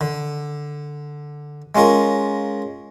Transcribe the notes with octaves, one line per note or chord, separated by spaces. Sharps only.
D3
G#3 C#4 F4 A#4